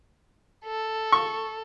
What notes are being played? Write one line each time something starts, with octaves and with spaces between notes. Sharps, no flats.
A4
C#6